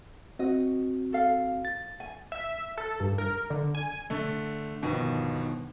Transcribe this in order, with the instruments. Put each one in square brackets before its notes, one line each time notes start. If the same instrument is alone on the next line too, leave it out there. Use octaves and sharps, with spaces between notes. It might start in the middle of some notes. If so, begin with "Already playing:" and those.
[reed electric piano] C4 F#4 [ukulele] D#5
[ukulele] A4 F5
[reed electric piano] A6
[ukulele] G#5
[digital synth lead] E5
A4
G2
A#4
D3
G#5
[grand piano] D3 A3
G1 B2 D#3 F3